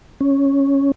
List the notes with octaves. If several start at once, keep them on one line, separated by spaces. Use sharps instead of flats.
C#4